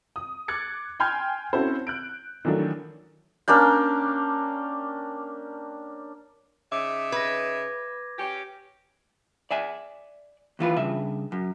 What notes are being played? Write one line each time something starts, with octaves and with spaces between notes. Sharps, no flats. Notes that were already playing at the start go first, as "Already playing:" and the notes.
D#6
D6 F#6 G#6 A6 C#7
G5 G#5 C6 F6 G6 G#6
C4 C#4 E4 F#4 A4 C5
F#6 G6 D7
D#3 E3 F#3 A3 D4
A#3 C#4 D4 G5
C#3 D#4 E5 D6
B4 G#6 A#6
C#4 G4
D5 E5 G#5
D#2 E3 F4 B4
G2 C#3 E5
F#2